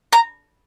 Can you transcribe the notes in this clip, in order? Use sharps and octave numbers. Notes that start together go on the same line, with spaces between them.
A#5